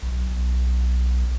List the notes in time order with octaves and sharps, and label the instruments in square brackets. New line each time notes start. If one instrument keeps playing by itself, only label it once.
[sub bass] B1